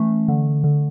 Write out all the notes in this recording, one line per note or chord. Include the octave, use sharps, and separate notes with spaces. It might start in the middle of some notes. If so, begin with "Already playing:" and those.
Already playing: E3 A3 C#4
D3
D3